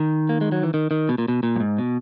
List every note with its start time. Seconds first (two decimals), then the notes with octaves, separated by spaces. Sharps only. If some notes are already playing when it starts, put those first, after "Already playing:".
Already playing: D#3
0.29 A#3
0.41 G#3
0.52 F#3
0.63 E3
0.74 D#3
0.91 D#3
1.09 B2
1.18 A#2
1.28 B2
1.43 A#2
1.56 F#2
1.60 G#2
1.78 B2